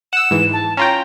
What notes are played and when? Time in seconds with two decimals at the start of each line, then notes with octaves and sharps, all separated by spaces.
0.13 F#5 E6 E7
0.31 G#2 E3
0.53 A5
0.77 C#4 F4 G5 A#5